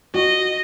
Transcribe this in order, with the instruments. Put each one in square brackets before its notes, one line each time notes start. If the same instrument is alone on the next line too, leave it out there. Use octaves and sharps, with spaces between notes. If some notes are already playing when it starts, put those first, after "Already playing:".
[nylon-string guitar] F#4 [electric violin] D#5